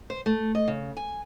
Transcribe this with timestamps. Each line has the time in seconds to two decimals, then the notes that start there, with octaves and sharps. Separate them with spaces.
0.10 C5
0.26 A3
0.55 D#5
0.68 C#3
0.97 G#5